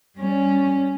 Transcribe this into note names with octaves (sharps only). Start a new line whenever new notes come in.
G3 C#4